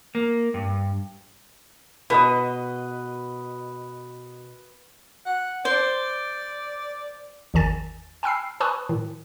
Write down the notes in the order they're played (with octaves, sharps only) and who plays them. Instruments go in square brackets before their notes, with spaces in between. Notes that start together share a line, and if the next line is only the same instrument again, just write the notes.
[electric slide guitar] A#3
G2
[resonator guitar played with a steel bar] B2 [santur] B4 D#5
[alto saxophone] F#5
[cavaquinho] C5 [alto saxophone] D5
[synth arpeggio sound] G#1 E2 D#3 G#5 A6
G5 G#5 B5 E6 F6 C7
B4 G#5 B5 C#6 D#6 F#6
A2 D#3